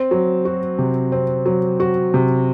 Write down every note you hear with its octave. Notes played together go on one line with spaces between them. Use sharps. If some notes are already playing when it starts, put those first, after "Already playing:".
Already playing: C4
F#3
F#4
C3
C4
F#3
F#4
C3